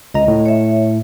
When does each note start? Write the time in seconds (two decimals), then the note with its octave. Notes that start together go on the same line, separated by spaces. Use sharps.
0.14 C#2 D#5 A#5
0.28 A2
0.46 C#5 E5